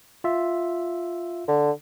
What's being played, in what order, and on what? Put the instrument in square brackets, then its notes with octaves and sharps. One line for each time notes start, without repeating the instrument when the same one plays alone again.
[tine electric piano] F4 E5
[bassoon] D3